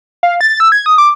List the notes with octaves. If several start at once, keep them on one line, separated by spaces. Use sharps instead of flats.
F5
A6
E6
G#6
D#6
D6